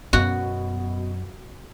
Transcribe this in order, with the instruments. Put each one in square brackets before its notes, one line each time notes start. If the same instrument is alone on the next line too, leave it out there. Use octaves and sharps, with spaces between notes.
[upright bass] F#2 [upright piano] B2 [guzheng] F#4